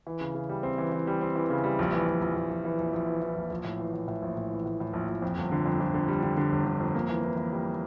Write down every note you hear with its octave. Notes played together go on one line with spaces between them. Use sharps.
E3
C#3
C#3
G3
C4
E3
E3
G3
C4
E3
C#3
G3
A#1
E3
A#1
A#1
A#1
A#1
E3
A#1
A#1
E3
E3
A#1
A#1
A2
E3
A2
A2
A#1
A2
E3
A2
A2
A#1
A#1
F2
G1
D3
F2
F2
D3
G3
D3
D3
G1
D3
F2
A#3
E3
E3
E3
G3